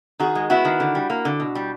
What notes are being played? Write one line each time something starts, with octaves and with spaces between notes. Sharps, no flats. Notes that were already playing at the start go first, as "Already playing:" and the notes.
D#3 F#4 G#4
G#3
B3 E4 F#4
D#3
D3
G3
A#3
D3
B2
G3